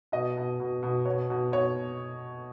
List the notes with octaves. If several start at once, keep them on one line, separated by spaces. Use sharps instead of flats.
B2 D#5
B2
B2
B2
B2 C#5
B2
B2 C#5